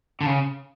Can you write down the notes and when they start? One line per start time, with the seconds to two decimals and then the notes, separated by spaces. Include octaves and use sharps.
0.21 D3
0.26 C#3